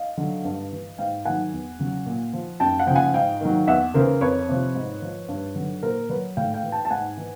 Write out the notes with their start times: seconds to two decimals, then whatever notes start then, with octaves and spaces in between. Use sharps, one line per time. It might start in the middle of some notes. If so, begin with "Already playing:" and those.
Already playing: D#5 F5
0.18 D3 F#3
0.45 G2
0.72 E3
0.98 G#2 F5 G5
1.25 D#3 F#3 F#5 G#5
1.53 E2
1.79 C#3 F#3
2.06 A#2
2.33 F3
2.60 F#2 G5 A5
2.80 F#5
2.87 C#3 F3 G5
2.96 F#5 G#5
3.14 G#2 F5 G5
3.41 D#3 F#3
3.68 E2 E5 F#5
3.94 C#3 E3 A#4 C5
4.21 F2 B4 C#5
4.49 C3 F3
4.75 G#2
5.02 F3
5.29 G2
5.56 D3 F#3
5.82 A#2 A#4 C5
6.09 F#3 B4 C#5
6.37 A2 F5 G5
6.54 F5 G5
6.63 E3
6.72 G5 A5
6.85 A5
6.90 G#2 F#5 G#5
7.17 E3